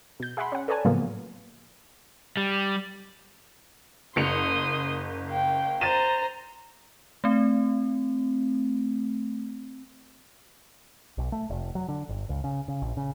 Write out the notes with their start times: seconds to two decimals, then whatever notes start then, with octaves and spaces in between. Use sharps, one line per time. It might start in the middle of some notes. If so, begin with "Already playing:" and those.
0.20 B2 G6
0.37 G#4 E5 F#5 B5 C6
0.52 C#4 F#5
0.68 A4 B4 C#5 D5 G#5 A5
0.85 A2 C#3 F3 F#3 A#3 B3
2.37 G3
4.16 F#1 C6 D#6 C#7 F7
5.27 F5 G5
5.81 C5 A#5 A6 D#7 E7
7.24 A3 C4
11.18 B1
11.32 A3
11.50 F1
11.75 F#3
11.88 D3
12.09 G1
12.29 C#2
12.44 C#3
12.68 C#3
12.82 A#1
12.97 C#3